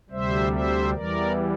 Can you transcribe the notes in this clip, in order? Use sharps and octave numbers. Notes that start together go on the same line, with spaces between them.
D2 C3 G3 C5 E5
C5 E5
E2 E3 G3 A#4 D5